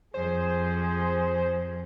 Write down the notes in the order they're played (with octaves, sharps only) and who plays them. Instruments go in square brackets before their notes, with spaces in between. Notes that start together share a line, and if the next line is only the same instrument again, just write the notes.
[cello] F2 [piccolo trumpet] G#4 [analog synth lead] C5